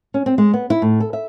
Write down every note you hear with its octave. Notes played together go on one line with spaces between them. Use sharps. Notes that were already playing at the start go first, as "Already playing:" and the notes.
C#4
C4
G#3
B3
E4
A2
A4
E5